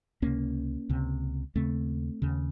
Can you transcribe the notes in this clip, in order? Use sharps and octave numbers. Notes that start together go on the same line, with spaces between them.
C#2 C3 A#3 C#4
C#2 C3
D#2 C#3 A3 C4
D#2 C#3